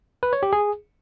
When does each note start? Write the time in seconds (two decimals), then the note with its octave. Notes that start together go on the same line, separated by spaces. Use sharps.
0.23 B4
0.33 C#5
0.43 G4
0.53 G#4